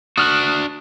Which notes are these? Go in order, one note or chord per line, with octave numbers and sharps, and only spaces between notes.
D4 F#4 D#6 F6 F#6